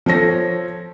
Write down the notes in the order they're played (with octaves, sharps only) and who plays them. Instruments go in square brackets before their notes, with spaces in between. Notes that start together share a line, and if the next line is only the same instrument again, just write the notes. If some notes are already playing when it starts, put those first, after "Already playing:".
[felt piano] F3 A4 C#5 A#6